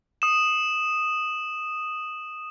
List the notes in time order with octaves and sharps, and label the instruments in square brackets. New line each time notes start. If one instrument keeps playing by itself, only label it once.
[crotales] D#6 E7